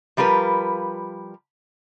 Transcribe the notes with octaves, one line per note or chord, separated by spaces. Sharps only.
F3 G3 F4 A#4 B4